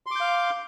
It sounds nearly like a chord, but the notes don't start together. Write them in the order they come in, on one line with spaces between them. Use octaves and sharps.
C6 D6 G6 F5